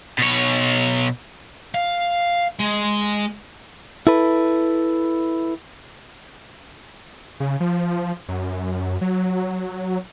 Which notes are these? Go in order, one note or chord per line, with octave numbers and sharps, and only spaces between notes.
B2 C#5
F5
G#3
E4 A4 B4
C#3
F3
F#2
F#3